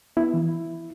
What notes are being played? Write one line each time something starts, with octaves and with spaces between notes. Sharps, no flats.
B3 E4
E3